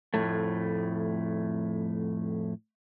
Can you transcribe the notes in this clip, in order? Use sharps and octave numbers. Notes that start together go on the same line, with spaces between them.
F2 A2 A3